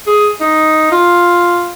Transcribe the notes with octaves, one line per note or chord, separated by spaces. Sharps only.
G#4
D#4
F4